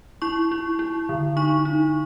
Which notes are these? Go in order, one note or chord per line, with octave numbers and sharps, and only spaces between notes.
E4 C#6
E4
E4
D3
D#4 C#6
D#4